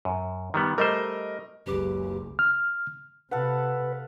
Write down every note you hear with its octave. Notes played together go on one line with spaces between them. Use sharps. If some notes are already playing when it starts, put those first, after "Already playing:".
F#2
D#3 G3 B3
G3 A3 A#4 C5 D#5
F#1 C#2 F#2 G4 B4 D6
F6
C3 A4 B4 F5 F#5